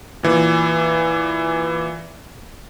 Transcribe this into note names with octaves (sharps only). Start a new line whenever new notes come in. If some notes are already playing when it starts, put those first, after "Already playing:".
A#2 E3